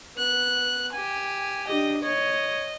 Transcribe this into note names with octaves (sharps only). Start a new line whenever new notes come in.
B3 F#6
G4 G#5
D4 G4 D#5
C#5 D#5